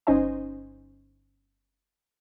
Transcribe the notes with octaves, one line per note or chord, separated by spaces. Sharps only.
G1 C#4 D#4 C5 D#5 G#5